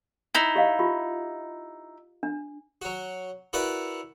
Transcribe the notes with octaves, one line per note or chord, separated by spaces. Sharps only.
D#4 E4
G4 D#5 F5
F4 G4
D4
F#3 F#4
E4 F#4 A#4 B4 D5 F#5